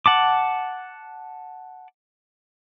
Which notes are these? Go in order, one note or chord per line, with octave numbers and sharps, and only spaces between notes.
F#5 A5 D6